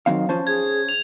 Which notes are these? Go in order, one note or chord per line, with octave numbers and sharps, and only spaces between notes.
D#3 F#3 C4 F5
F3 C#4 C5 A5
G#4 G#6
F7